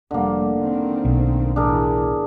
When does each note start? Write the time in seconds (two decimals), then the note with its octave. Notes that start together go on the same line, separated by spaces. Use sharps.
0.11 F1 D3 G3 A3 A#3
0.56 D#3 C4
1.05 B1
1.56 E2 A2 E3 D4 G#4 A#4